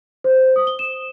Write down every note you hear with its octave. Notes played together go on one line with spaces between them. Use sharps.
C5
D#6
G7
E7